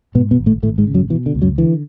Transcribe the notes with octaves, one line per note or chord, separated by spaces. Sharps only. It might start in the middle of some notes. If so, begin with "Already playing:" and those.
G#2 B2 B3
B2 B3
G#1
A2 A3
G#1 A2 A3
G#2 G#3
C#3
F#2 F#3
B2 E3
D3
C#2
F#2 F#3
D3 E3